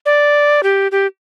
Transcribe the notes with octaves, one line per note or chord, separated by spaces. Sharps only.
D5
G4
G4